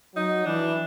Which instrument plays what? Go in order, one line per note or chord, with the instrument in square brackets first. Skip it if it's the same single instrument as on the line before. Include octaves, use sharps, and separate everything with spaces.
[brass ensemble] F#3 [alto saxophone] D#4
[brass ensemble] E3 [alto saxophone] D4